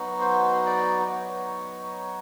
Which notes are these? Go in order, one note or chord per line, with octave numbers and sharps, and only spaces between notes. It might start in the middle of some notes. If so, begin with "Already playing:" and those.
Already playing: F#3 B3 D#4 F#4
C5
D5
D5
C#5